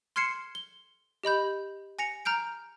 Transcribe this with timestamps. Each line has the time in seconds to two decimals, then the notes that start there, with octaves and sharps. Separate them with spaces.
0.16 C6 F6 G#6 C7 C#7 E7
0.55 G7
1.24 G4 D#5 B5 G6
1.99 G#5 A#6 C#7 F7
2.25 A#5 F6 G6 D7